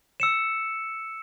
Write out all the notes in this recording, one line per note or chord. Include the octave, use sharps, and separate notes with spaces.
E6 C#7 E7